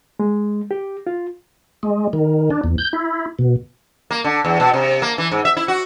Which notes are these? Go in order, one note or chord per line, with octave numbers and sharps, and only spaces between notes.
G#3
G4
F4
G#3
D#3
D4
E2
G6
E4
B2
A#3
D3
E2
B2
C3
A#3
E3
G#2
E5
E4
F#4